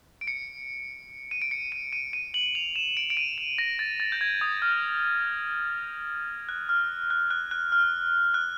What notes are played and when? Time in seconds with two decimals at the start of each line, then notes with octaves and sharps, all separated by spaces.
0.21 D7
0.27 C#7
1.31 D#7
1.42 D7
1.51 C#7
1.72 D#7
1.93 D#7
2.13 D#7
2.34 F#7
2.55 F7
2.76 E7
2.97 D7
3.10 D7
3.17 D#7
3.38 E7
3.58 A#6
3.79 A6
4.00 A6
4.12 G6
4.21 G#6
4.41 D#6
4.62 F6
6.49 F#6
6.69 F6
7.10 F#6
7.31 F#6
7.51 F#6
7.72 F6
8.34 F#6